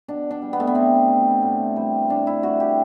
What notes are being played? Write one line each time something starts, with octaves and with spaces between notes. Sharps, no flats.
B2 D4
D4
G3
B3
A3
B3
B2 C4
G3
A2
E3 G3
A2 D4
E4
E3 G3 F#4
G4